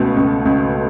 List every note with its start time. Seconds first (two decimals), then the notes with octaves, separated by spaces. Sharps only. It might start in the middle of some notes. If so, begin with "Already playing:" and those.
Already playing: C#2 B2 A3
0.17 C#2
0.45 C#2